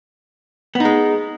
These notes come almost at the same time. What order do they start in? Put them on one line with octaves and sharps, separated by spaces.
B3 D#4 G#3